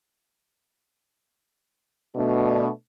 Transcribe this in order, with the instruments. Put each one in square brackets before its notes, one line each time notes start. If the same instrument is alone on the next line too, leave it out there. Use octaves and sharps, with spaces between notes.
[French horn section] B2 A3 D4